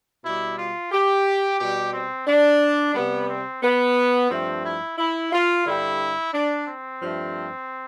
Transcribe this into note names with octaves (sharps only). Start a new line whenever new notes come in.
B2 G3 E4
F4
G4
B2 G3 G4
C4
D4
C3 G3 B3
C4
B3
G2 F3 A3 C4
E4
E4
F4
G2 D3 G3 E4
D4
C4
G2 F3 A3